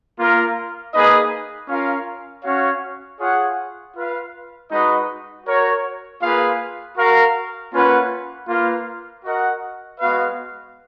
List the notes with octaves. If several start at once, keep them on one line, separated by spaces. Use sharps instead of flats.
A#3 F4 A#4
A#3 D#4 G#4 B4 D#5
C#4 F4 A#4 F5
C#4 F#4 C#5 F5
F4 G#4 C#5 F#5
F4 B4 F5
G#3 D#4 F#4 B4 D#5
F#4 A#4 C#5
A#3 F4 G#4 B4 F5
F#4 A#4 F5
A#3 C#4 F4 B4 F#5
A#3 F4 B4 F5
F#4 A#4 D#5 F#5
G#3 B3 F#4 B4 F5